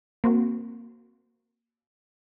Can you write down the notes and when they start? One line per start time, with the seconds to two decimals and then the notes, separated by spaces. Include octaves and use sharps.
0.24 A#3 C4 F#4